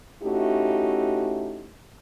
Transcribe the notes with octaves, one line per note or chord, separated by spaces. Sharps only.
A3 C#4 D#4 E4 F#4 G4